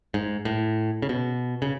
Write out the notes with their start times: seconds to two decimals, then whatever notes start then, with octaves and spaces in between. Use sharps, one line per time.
0.14 G#2
0.45 A2
1.02 C#3
1.09 B2
1.62 C#3